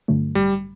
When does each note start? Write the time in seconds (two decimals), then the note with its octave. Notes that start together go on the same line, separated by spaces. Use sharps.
0.08 G2 D3 F#3 A3
0.35 A1 G3